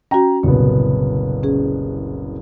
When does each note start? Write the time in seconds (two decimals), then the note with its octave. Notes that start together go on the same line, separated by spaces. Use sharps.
0.11 C#4 F#4 G5 A#5
0.43 F#1 C2 A#2 B3
1.43 C#4 G#4